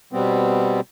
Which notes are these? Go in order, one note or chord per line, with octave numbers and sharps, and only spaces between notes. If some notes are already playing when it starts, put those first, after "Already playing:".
B2 G3 B3 C4